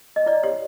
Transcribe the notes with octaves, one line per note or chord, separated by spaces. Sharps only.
D#5
E4 D5
G4 C#5